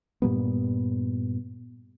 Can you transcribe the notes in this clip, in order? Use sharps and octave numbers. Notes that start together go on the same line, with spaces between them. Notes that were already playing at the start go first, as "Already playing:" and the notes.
G2 A#2 G3 B3